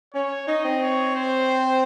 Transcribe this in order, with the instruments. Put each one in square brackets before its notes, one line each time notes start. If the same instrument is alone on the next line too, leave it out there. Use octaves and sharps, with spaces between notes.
[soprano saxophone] C#4 [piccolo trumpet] C#5
[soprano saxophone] D#4 [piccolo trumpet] D#5
[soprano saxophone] C4
[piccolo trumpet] C#5
C5